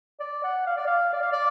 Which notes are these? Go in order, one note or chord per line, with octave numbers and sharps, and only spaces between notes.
D5
F#5
F5
D5
F5
D5
F5
D5